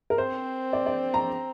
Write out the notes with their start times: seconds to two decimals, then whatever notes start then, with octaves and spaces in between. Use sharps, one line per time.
0.10 A#4
0.18 C4 C5
0.73 D5
0.86 D5
1.14 A#5